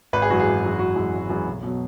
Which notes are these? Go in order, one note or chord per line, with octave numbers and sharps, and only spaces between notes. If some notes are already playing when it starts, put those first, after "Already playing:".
G#1 B4
G#4
F#2 E3 G#3 F#4
G#4
G#1
F#2 E3 G#3
G#1 F#4
F#2 E3 G#3
G#1
F#2 E3 G#3
B1
B2 F#3